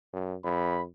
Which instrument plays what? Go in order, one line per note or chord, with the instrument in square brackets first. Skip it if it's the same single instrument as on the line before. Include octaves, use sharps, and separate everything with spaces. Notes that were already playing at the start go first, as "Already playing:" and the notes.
[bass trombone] F#2
[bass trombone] F2 [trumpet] B5